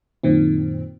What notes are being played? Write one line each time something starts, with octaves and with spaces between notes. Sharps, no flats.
F#2 A#2 D#3 C4